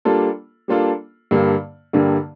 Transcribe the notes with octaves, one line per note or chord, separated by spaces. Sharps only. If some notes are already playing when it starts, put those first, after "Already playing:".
G3 A#3 D4 F4 A4
G3 A#3 D4 F4 A4
G2 D3 G3 A#3
G2 D3 G3 A#3